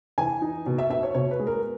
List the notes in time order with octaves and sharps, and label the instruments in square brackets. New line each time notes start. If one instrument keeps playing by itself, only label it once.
[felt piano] E3 G#5
D#4
B2
E5
B2 E5
C#5
B2 C#5
B4
G#3
A#4